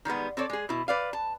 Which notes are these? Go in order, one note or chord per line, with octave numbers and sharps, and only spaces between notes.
D#3 G3 G#3 B3
C4 A4 C#5 D5
G#3 G#4
B2 E4
B4 D5 F5
A5